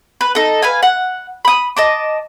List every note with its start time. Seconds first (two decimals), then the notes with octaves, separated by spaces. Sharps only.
0.21 B4
0.35 D#4 A4
0.62 B4 F5 G#5
0.83 F#5
1.45 B5 D#6
1.77 D#5 A5 D6